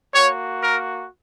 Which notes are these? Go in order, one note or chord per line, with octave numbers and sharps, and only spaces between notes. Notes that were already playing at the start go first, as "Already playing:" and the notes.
A#3 F#4 C#5
A#4